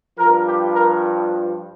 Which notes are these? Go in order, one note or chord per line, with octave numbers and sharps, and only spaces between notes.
G2 F3 A#4
G4
A#4